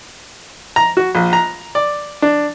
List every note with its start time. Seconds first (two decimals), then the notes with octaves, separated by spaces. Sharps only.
0.76 A#5
0.97 F#4
1.15 A#1
1.33 A#5
1.75 D5
2.22 D4